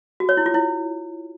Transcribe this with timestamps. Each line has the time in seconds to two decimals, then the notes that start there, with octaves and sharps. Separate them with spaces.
0.20 F#4
0.29 C#5
0.37 E4
0.46 F4
0.54 E4